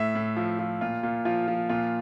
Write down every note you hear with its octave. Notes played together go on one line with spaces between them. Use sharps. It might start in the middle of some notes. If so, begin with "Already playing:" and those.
Already playing: A2 E5
A2
F3
F3
A#2 F4
A#2
F3 F4
F3
A#2 F4